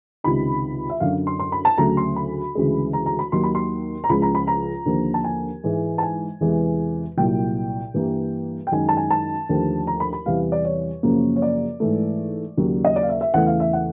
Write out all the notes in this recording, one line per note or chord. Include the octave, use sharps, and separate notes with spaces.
C#2 C3 D#3 B5
E5
F#2 D3 F#3 F5
C6
C6
B5
A5
D2 C#3 F#3 A3 A#5
C6
B5
D2 C#3 E3 G#3
A#5
A#5
B5
D#2 D#3 F#3 A#3 C6
B5
C6
A#5
C#2 C#3 F3 G#3 B5
A#5
B5
A#5
D#2 D3 F3 A#3
A5
G#5
G#2 E3 G#3
A5
G#5
E2 C3 E3 G#3
C2 A#2 F#3 G5
G2 E3 G3 A#3
G5
F#2 D#3 G#3 G#5
A5
G#5
A5
D#2 D3 F3 A3
A#5
B5
B5
E2 C3 E3 G3 F5
D5
C#5
F#2 C#3 F3 A#3
C#5
D5
G#2 E3 A3
D#2 C#3 F#3 A#3
D#5
D5
F5
E5
E5
E2 C#3 E3 A3 F#5
F5
E5
F#5